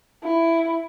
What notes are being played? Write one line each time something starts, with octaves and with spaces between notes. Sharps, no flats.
E4